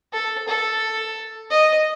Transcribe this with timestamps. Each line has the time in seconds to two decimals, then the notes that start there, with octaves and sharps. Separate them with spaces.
0.13 A4
0.48 A4
1.50 D#5